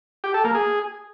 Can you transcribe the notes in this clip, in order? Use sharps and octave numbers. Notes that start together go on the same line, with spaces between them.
G4
A4
A#3
G#4